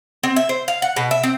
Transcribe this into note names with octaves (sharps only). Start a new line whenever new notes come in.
C4
E5
C5
F5
F#5
B2
E5
C4